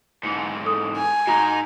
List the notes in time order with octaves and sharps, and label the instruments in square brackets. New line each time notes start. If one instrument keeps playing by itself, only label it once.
[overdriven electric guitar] G#2 E3 [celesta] C#7
[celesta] A4 D#6
[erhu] G#5
[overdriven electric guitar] G#2 D#4 [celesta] F#4 A#5